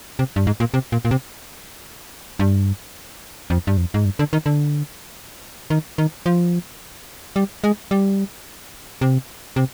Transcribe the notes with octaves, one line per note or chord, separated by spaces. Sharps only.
C3
G2
G#2
A#2
C3
A#2
A#2
C3
G2
F2
G2
F2
G#2
G2
D3
D#3
D3
D#3
D#3
F3
G3
G#3
G3
C3
C3